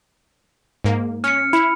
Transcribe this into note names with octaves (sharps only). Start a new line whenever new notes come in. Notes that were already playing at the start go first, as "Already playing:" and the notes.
G#2 A#3
C#4 F6 C#7
E4 B5